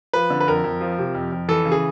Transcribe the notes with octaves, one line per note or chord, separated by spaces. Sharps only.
F3 B4
D3
B4
F2 A#4
F2
F3
C3
F2
F2
E3 A4
C#3
G#4